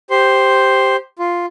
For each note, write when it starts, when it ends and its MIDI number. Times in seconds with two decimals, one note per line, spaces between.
0.10 0.96 67
0.10 0.96 72
0.10 0.96 84
1.19 1.46 65